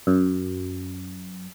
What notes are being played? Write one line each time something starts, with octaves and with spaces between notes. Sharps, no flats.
F#2